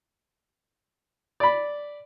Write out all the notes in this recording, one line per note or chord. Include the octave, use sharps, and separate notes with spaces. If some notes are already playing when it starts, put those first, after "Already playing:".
D5 B5